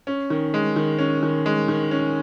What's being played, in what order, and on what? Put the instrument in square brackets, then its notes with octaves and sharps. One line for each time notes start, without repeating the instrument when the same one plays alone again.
[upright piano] C#4
D#3
G#3
D#3
C#4
D#3
G#3
D#3
C#4